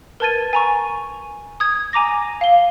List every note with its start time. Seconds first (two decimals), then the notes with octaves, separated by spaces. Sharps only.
0.20 A#4 B4 A5 G#6 A6 D#7
0.53 G#5 A#5 C#6
1.60 D#6 G#6
1.93 G#5 A#5 D6 A#6
2.41 F5 G7